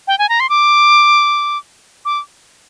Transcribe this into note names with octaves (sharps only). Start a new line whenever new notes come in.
G5
G#5
A#5
C6
D6
D6